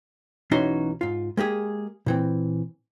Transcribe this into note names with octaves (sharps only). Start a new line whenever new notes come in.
B1 E3 C#4 D#4 F#4 C6
G#2 F4
G#3 A#3 G4 G#4
A#2 E3 C4